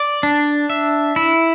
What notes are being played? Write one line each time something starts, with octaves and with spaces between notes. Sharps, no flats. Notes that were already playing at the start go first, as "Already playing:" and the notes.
Already playing: D5
D4
E5
E4